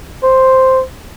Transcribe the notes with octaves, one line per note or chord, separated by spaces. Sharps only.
C5